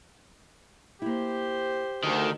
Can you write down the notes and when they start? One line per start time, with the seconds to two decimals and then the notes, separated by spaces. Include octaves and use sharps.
1.02 A#3 E4 G4 C5
2.04 D2 D#3